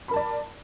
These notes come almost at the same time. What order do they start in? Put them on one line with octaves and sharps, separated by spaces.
B5 A#4 A5 D5